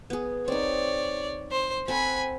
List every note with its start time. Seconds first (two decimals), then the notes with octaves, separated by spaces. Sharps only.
0.10 B3 G#4
0.48 C4 D#4 C#5 D5
1.51 C5
1.88 C4 A4 F#5 G#5 B5